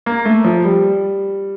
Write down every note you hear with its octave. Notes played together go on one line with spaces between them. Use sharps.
A#3
A3
F3
G3